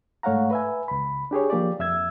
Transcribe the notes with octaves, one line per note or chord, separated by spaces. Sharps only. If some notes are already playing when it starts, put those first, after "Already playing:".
G#2 A3 C#5 F5 F#5 A#5
B4 E5 G#5
C#2 B5
D4 G4 G#4 C#5
F3 A#3 G4 D5
F2 E5 E6 G#6